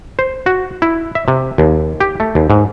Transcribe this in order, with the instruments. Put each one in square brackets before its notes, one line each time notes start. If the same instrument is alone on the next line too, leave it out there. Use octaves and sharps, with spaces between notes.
[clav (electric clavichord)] C5
F#4
E4
E5
C3
D#2
G4
A3
D#2
G#2